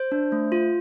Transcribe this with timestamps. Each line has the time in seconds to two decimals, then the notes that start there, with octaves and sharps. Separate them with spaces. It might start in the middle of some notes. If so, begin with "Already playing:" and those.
Already playing: C5
0.12 D4
0.32 A3
0.52 F4